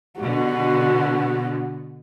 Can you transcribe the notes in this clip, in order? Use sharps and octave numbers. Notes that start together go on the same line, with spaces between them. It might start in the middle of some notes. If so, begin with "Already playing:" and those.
B2 D3 F#4